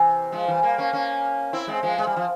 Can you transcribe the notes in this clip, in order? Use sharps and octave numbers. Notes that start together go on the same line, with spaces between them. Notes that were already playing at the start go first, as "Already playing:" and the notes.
Already playing: C3 E3
F3 G#3
E3 G3
G3 A#3
A#3 C#4
A#3 C#4
C4 E4
G#3 C4
F3 G#3
G#3
G3
F3